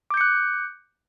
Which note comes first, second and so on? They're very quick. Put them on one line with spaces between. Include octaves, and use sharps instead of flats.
D6 G6 C#7 F#6